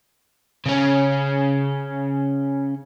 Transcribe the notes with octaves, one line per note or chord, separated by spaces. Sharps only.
C#3 C#4